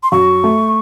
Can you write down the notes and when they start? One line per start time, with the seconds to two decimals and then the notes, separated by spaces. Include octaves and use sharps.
0.03 C6
0.12 F#2 C#6
0.44 A3